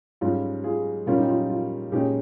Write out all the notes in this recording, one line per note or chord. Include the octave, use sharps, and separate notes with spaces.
G#2 G3 C#4 F4
F4 G#4
A#2 G3 A#3 C#4 F4
D#4 G4
F4
F4
A#2 G#3 C#4 D#4 G4